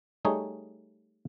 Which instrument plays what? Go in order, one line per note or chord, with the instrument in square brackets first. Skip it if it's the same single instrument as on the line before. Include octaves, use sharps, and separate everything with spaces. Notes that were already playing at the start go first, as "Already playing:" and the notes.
[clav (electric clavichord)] G3 A3 D#4 G#4 C#5